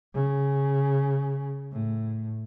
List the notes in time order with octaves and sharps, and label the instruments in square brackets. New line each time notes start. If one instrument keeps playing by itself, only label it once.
[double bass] C#3
A2